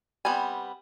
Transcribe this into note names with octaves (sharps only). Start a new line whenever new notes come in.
G3 B3 C4 G#5